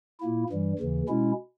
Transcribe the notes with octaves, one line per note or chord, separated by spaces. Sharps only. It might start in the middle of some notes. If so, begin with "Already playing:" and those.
A#2 A#3 E4
G2 E3 G3
D#2 C#3 E3
B2 G#3 C#4 E4